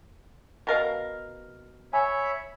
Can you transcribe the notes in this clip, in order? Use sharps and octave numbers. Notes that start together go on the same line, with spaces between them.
B2 A#4 F5
C#5 E5 G#5 B5